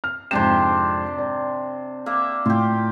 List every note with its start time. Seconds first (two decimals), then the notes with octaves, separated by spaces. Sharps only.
0.04 F6
0.31 F2 G#2 C3 D4 C5 E7
1.18 D5
2.06 A#3 E5
2.46 A2 F4 G4